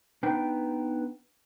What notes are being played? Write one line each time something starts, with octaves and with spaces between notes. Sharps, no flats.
B3 D4 D#4 B4 G5